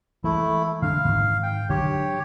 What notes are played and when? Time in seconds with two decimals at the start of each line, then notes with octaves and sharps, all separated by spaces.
0.24 E3 G#3 A3 E4
0.82 D3 G#3 D4 F5
1.05 G#2 D#3
1.43 G5
1.70 D3 F#3 G#3 G4 C#5